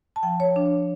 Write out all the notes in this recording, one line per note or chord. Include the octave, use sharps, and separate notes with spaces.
A5
F3 G5
C#5
F3 D4